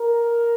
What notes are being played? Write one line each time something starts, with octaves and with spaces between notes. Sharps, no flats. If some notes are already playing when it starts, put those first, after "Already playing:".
Already playing: A#4